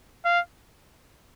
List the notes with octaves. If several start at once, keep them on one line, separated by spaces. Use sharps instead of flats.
F5